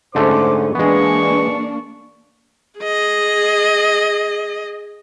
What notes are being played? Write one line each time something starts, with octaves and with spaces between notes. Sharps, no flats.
G#2 D3 A3 C#4 C5 D6
E3 G#3 A#3 B3 D4 C#6
G#4 D#5